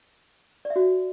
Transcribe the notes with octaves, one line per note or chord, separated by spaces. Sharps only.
D5
E5
F#4